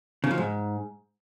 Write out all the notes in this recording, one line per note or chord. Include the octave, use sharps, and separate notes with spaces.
C#3
F3
G#2